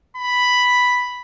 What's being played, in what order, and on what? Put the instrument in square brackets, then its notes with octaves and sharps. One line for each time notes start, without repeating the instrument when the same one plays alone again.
[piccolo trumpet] B5